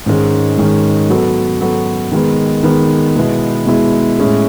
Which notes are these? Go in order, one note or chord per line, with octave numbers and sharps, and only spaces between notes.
G#2 D#3 G#3 C#4
G#2 D#3 G#3 C#4
F#3 B3 F#4 A4
F#3 B3 F#4 A4
D#3 G#3 B3
D#3 G#3 B3
B2 G#3 B3 E4
B2 G#3 B3 E4
A2 G#3 C#4 E4 G#4